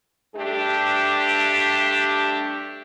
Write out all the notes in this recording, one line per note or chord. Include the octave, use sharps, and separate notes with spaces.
G2 A3 D4 G4